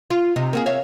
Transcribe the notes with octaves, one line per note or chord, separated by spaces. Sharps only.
F4
C3 D#4
A#3 F#4 G#4
C#5 E5 F5